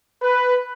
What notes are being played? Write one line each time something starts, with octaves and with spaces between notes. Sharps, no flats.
B4